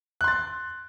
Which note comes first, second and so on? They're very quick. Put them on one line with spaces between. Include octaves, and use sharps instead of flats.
F#6 C6 A6